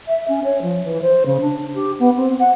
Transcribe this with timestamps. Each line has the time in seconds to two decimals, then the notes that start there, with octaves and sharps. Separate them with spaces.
0.08 E5
0.28 C#4
0.44 C#5
0.62 F3
0.84 E3
1.02 C5
1.26 C#3
1.41 D4
1.74 G4
1.99 B3
2.16 C4
2.39 F#5